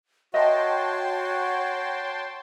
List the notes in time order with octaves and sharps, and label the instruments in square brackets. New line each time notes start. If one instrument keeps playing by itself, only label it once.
[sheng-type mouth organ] F#4 [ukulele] A#4 D#5 E5 [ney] C#5 [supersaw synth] G5 A5 C6